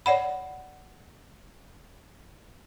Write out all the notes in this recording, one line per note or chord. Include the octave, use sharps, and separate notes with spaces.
C#5 D5 F#5 B5